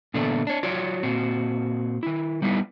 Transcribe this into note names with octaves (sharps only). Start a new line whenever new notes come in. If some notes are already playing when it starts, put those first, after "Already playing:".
A#2 D3 E3 A3 B3 D5
D4 C#5
F#3 F4 C#5 D5
A#2 C4 F#4
D#3 E4
G3 B3 D#4 E4